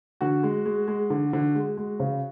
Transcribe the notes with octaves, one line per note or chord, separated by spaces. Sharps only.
D3 F#4
G#3
G#3
G#3
D3
D3
G#3
G#3
C#3